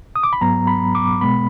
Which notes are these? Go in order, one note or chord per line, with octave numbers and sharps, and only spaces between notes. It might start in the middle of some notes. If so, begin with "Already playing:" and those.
D#6
D6
B5
G#2 F#3 B3 A#5
B5
D6
B2 G#3 B3 B5